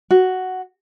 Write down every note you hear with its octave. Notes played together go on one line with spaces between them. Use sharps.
F#4